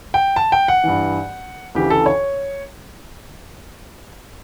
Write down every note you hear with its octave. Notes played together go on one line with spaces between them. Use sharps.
G5
A5
G5
F#5
G2 E3
D2 C#3 E3 G4
A4
C#5